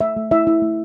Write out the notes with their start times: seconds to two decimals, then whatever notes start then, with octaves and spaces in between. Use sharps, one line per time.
0.01 A3 E5
0.17 A3
0.31 E4 E5
0.47 E4
0.62 A3